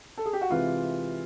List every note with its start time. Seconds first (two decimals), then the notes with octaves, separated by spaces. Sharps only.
0.18 A4
0.26 G#4
0.33 G4
0.41 F#4
0.49 C3 E3 G#3 F4